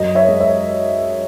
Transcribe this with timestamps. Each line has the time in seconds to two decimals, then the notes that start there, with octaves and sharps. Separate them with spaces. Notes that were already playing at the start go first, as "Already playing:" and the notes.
Already playing: F#2 D#5
0.15 C#5 E5
0.28 G#3
0.40 C#5 E5